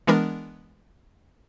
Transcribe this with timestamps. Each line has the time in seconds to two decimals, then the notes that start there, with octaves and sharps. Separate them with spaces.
0.07 E3 G#3 B3 D4 A#4